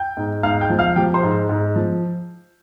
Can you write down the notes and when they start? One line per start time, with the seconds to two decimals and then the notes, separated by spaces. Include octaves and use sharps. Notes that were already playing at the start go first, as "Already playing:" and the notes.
Already playing: G5 G6
0.17 G#2
0.43 G#2 F5 F6
0.61 G5 G6
0.70 F3
0.79 F5 F6
0.96 F3 G4 G5
1.14 C5 C6
1.23 G#2
1.49 G#2
1.76 F3